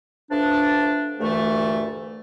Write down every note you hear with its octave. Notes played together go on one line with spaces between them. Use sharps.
F3 A3 B3 D4
D2 G2 A#2 E3 A3